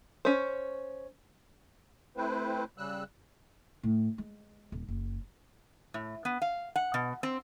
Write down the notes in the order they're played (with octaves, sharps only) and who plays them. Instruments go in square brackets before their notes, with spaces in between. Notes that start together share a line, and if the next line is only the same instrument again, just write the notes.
[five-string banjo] C#4 C5
[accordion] A3 C4 E4 B4 C5
C#3 G3 E6 F#6
[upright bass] A2
G#3
D#1
F#1
[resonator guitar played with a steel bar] A2
B3
F5
F#5
B2
C4